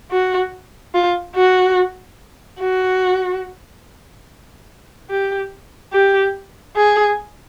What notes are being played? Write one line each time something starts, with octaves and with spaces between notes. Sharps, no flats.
F#4
F4
F#4
F#4
G4
G4
G#4